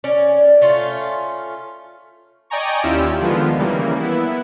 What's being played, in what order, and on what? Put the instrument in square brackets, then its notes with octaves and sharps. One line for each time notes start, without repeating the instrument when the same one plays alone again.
[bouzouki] C#4 D5
A3 C#4 F4
[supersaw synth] D5 D#5 G5 G#5 A#5 C#6
D#2 C#4 E4 F4 G4 E6
D3 D#3 F3 G#3 B3 F4
C#3 E3 G3 A#3
B3 E4